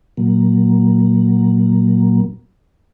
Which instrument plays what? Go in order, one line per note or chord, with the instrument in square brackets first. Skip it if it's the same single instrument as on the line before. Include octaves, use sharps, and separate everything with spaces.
[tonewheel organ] A#2 F#3 A#3